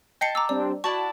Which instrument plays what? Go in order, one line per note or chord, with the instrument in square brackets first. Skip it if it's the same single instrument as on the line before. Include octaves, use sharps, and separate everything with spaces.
[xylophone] D#5 C7 C#7 [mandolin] G5 A5
[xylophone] A#5 D6 E6
[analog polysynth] G3 C4 D4 [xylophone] D5
[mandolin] E4 D5 A5 [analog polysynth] F#4 [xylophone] C#6